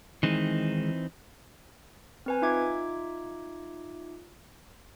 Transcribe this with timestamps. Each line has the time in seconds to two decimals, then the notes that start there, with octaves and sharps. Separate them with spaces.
0.23 D#3 E3 G#3 C4 D#4
2.26 C4 B4 G#5
2.42 D#4 F4 E5 D6 G#6